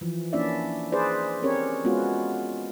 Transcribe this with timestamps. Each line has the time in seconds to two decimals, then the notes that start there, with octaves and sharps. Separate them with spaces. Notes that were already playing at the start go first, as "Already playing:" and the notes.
0.01 E3 F3
0.33 A#3 C#4 D4 E4 D5 E5
0.92 G#4 B4 C5 D5
1.42 C4 C#4 G4 A#4 C#5
1.84 G#3 B3 C#4 F4 F#4